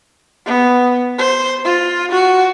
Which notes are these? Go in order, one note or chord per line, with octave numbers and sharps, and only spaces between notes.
B3
C5
F4
F#4